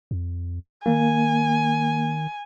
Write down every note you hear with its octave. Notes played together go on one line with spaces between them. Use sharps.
F2
D#3 A#3 G#5